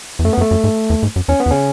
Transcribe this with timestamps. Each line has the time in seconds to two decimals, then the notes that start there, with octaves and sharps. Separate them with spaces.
0.19 E2
0.25 F#2 A3
0.33 B3
0.38 F#2
0.41 A3
0.51 F#2
0.64 G#2
0.90 E2
1.03 G#2
1.16 F#2
1.28 E2 C#4
1.40 B3
1.46 E2
1.51 C#3 C#4